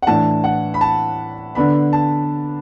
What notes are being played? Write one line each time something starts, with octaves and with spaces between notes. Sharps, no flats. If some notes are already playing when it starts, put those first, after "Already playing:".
F#5
A2 E3 D4 A5
F#5
B5
A5
D3 B3 D4 B5
A5